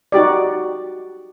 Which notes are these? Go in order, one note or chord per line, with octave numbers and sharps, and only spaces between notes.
D#4 F#4 G4 D5